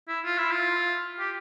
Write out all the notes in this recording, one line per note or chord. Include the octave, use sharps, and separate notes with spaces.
E4
F4
E4
F4
G4